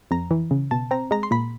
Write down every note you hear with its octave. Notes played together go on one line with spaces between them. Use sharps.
F2 A#5
E3
C#3
B2 A5
C4 A#5
G#3 A#5
C6
A#2 B5